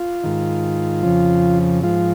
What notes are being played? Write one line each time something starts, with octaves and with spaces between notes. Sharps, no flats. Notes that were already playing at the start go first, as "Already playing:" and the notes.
Already playing: F4
G#2 D#3
F2 C#3 F3
G#2 F3 F4